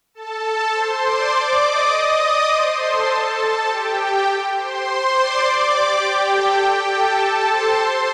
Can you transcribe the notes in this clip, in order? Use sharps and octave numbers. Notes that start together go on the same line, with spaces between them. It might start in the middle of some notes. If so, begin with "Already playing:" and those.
A4 A5
C5 C6
D5 D6
D#5 D#6
D5 D6
C5 C6
A4 A5
A4 A5
G4 G5
C5 C6
D5 D6
G4 G5
A4 A5
G4 G5
A4 A5
C5 C6
C5 C6